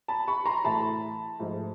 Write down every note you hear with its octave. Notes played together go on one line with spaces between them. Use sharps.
A5 B5
B5 C#6
A#5 C6
A2 E3 A3 A5 B5
G#2 F3 A3